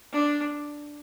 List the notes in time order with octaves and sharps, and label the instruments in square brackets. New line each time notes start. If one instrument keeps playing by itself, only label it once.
[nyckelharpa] D4